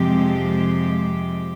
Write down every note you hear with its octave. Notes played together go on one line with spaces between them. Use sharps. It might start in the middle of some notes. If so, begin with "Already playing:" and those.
Already playing: F2 C3 F3 G#3 G4